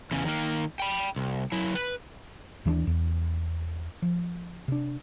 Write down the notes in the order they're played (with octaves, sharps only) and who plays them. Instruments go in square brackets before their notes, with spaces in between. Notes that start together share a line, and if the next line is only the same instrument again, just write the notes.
[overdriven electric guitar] E2 C#3
D#3 A#3
G5 B5
C2
F#3 E4
B4
[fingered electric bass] D#2 E3 G#3 D4
E2
F3
C3 D4